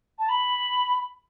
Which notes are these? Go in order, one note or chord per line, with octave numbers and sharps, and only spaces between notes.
A5
B5